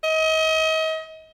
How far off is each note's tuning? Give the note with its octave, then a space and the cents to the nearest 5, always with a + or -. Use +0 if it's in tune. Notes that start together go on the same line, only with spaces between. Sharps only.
D#5 +35